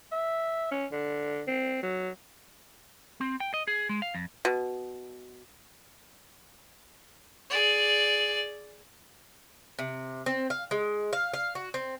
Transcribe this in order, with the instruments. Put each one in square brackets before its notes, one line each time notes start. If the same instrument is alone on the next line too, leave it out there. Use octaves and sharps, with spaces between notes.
[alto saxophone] E5
C#4
D3
C4
F#3
[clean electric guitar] C4
G5
D#5
G#4
G#3
F5
F2
[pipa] B2
[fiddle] G#4 D5
[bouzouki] C3
C4
F5
G#3
F5
F5
F#4
C4